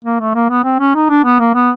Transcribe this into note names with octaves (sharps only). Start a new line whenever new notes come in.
A#3
A3
A#3
B3
C4
C#4
D#4
D4
B3
A#3
B3